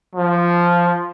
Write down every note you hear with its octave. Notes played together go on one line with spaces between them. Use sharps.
F3